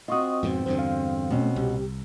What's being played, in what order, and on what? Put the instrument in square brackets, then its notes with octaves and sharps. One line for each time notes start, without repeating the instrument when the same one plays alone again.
[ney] C4 [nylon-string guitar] F4 F#4 [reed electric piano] D#5 C#6 D#6
[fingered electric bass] F2 G#2 B2
[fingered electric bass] E2 G2 D3 [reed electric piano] C5
[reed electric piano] F5
[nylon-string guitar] B2 C#4 [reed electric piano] A3
[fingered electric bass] C2 [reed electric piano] G4